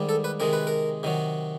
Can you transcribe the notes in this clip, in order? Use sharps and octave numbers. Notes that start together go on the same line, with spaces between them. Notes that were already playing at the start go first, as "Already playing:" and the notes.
Already playing: G#2 D#3 G3
A4
B4
C3 D#3 G#3 A#4
B4
A#4
C3 D#3 F#3